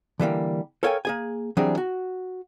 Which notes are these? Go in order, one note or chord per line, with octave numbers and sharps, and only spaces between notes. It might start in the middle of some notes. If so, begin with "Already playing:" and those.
D3 E3 G3 A#3
A4 A#4 C#5 F5 G5 G#5
A#3 G#4 G#5
E3 F#3 G3 C4 D4 G#4
F#4